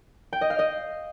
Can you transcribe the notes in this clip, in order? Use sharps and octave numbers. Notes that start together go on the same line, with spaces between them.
G5
D#5
F5
D#5